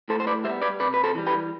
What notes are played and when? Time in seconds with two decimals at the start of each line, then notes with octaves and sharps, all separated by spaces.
0.09 A2 A4 C5
0.20 C5
0.27 B4 D5
0.44 G3 C5 E5
0.49 B3
0.62 B4 D5
0.80 C3 B4 D5
0.94 B4
1.04 A4 C5
1.15 E3 G3
1.26 G4 B4